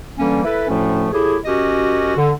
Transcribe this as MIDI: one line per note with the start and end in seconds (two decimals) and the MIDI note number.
0.19 0.41 50
0.19 0.41 52
0.19 0.41 55
0.19 0.41 58
0.19 0.41 61
0.44 0.67 64
0.44 0.67 69
0.44 0.67 71
0.68 1.07 38
0.68 1.07 45
0.68 1.07 53
0.68 1.07 57
0.68 1.07 61
1.11 1.35 45
1.11 1.35 64
1.11 1.35 67
1.11 1.35 68
1.45 2.15 42
1.45 2.15 61
1.45 2.15 66
1.45 2.15 67
1.45 2.15 75
2.15 2.30 50